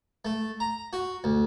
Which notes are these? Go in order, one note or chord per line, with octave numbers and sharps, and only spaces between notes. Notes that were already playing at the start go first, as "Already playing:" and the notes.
A3
A#5
F#4
D2